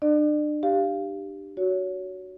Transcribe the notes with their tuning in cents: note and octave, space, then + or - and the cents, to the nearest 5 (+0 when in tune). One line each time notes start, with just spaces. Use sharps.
D4 +35 D5 +35
G4 +0 F5 -15
F#4 +5 C#5 +25